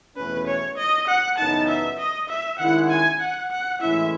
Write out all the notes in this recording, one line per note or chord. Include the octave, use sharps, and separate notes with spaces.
E2 B2 A3 C#4 B4
C#5
D#5
F#5
F#2 C#3 E3 B3 D#4 A5
E5
D#5
E5
D#3 G#3 C#4 E4 F#5
G#5
F#5
F#5
A2 E3 G#3 C#4 E4 E5